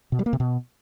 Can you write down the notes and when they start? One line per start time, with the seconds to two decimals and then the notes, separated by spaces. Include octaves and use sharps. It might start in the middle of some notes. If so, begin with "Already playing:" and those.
0.12 B2
0.19 G3
0.26 A#3
0.33 C3
0.40 B2